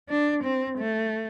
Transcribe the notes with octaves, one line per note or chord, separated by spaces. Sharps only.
D4
C4
A3